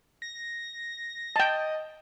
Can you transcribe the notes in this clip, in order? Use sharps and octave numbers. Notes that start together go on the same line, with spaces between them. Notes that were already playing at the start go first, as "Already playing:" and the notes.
A#6
D#5 G5 A5